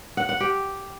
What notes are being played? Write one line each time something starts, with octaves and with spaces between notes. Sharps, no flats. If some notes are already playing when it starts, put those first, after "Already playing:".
F#5
F#5
G4